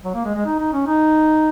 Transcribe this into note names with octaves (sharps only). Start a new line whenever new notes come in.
F#3
A#3
G#3
G#3
D#4
D#4
C#4
D#4